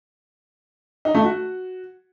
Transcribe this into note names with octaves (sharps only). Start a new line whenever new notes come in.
D#4
A3
F#4